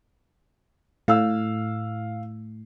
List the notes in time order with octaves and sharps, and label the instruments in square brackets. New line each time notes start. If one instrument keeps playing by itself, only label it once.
[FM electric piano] A2 [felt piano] F5 E6